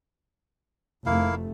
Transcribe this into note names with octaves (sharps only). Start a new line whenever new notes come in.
F1 A3 A#3 E4 F5